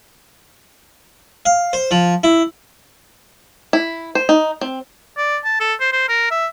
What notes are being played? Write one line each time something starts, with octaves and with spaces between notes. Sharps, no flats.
F5
C5
F3
E4
E4
C5
D#4
C4
D5
A5
A4
C5
C5
A#4
E5